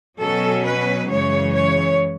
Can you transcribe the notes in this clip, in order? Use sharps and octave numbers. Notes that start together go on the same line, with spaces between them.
B2 F#3 C#4 A4
B4
F#2 C#3 E3 G#3 C#5
C#5